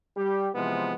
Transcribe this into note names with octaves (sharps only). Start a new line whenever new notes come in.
G3 G4
C3 E3 F3 G#3 B3